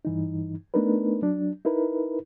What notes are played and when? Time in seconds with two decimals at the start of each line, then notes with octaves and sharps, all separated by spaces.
0.05 G2 E3 D#4
0.74 A3 B3 D4 D#4 A#4 B4
1.22 F#3 D4
1.65 D#4 E4 A#4 B4